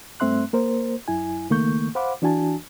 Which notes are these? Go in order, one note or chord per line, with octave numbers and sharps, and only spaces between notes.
G2 A3 C4 E5 C6 F#6
A#3 A#4 C5
F#2 E4 G#5
C#2 D#3 A3 A#3 C#6 G6
C5 F5 F#5 B5 D6
E3 D4 F#4 G#5 A5